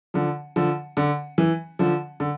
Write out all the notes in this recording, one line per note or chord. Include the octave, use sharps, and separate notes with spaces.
D3 F3
D3 F3
D3
E3
D3 F3
D3